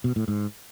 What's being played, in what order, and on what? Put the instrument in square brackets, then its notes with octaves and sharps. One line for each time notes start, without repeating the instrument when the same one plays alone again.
[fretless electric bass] B2
A2
G#2